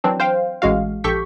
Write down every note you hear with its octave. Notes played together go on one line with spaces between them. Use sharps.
E3 F#3 C4 D4
C5 F5 G5
A1 G#3 F#4 F5
A#1 G4 A4 C#6 G6 B6